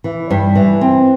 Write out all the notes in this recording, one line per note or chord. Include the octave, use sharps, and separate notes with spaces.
E3
G2
E3
C4